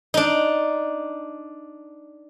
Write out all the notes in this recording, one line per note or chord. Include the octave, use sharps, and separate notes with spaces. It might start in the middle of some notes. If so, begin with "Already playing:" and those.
D4 D#4